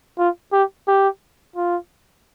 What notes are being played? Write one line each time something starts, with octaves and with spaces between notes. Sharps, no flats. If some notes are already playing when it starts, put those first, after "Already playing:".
F4
G4
G4
F4